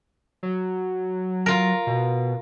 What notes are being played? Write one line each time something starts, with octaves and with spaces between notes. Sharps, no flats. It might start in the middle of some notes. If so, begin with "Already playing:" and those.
F#3
F4 A#4
B2